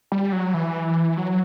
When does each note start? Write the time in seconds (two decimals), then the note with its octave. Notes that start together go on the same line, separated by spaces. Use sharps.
0.12 G3
0.32 F#3
0.54 E3
1.17 F#3